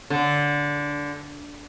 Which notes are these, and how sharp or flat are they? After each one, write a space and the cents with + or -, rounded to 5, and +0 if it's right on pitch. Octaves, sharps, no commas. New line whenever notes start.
D3 -15